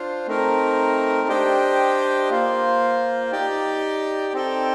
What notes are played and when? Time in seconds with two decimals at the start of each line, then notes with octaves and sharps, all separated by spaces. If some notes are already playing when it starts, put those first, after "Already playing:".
Already playing: D4 F4 C5
0.27 A3 C4 D#4 A#4
1.28 D4 G4 C5 D#5 G5
2.30 A#3 F4 C5
3.31 D#4 G4 D5 G5
4.33 C4 D#4 A4 D5 G5